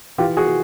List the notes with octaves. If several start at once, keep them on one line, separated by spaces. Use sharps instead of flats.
E3 F4 G4
F#4 G#4